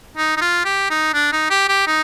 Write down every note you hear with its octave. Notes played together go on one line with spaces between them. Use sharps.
D#4
D#4
F4
G4
D#4
D4
D#4
G4
G4
D#4